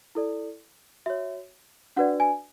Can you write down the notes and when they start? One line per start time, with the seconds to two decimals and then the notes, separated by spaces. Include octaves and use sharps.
0.15 E4 A4 D5
1.06 F#4 C#5 E5
1.96 D4 F#4 B4 D5 F#5
2.20 G#5